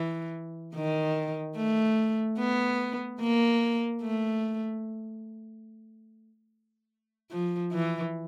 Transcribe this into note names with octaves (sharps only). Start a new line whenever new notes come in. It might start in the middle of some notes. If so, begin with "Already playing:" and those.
Already playing: E3
D#3
A3
B3
A#3
A3
F3
E3